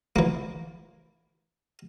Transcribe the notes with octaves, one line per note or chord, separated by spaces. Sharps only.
E3 A#3